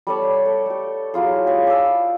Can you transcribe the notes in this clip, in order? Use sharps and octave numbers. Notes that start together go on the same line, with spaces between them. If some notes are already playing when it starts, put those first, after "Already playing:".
G3 A4 C#5 D5
A4
A3 G4
F#3 E4 F4 G#4
G4 G#4 C#5
D5 A5 E6